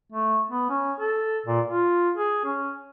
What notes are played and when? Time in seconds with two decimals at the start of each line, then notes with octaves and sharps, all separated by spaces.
0.12 A3
0.51 B3
0.69 C#4
1.00 A4
1.46 A#2
1.67 F4
2.17 G#4
2.45 C#4